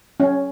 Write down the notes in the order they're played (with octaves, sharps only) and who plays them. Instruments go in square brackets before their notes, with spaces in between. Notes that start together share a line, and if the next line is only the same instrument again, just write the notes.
[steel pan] C#4